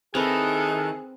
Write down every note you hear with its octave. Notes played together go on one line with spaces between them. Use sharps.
D#3 C4 E4 G#4 A4 B4 F#6